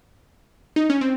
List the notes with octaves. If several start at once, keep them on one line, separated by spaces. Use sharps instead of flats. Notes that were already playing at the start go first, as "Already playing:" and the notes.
D#4
C#4
C4